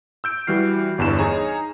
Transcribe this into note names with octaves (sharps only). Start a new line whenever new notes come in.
E6 G6 D7
E3 G3 F#4 F6 C7
G1 E2 G2 E7
D#4 G#4 C#5 G#5 A#5